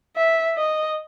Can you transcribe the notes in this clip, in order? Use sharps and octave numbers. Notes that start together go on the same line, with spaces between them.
E5
D#5